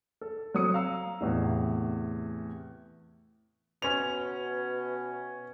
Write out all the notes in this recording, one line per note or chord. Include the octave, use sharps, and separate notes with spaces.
A4
F#3 C4 D#6 C#7
F5 A#5 E6
E2 A2 C3
B2 C#4 F7